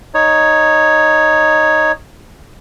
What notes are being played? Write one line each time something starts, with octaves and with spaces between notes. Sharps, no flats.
D#4 C#5